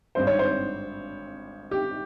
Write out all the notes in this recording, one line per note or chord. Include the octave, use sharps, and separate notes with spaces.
G#1 G2 G3 C4 C5
C#5
C5
G4